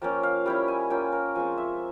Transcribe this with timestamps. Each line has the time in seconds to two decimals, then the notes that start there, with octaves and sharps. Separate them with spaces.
0.02 F3 A#3 C#4 G5
0.23 F5
0.46 G3 C#4 E4 G5
0.68 G#5
0.90 A#3 C#4 F4 G5
1.12 A#4
1.35 F3 G#3 C4 G#5
1.58 E5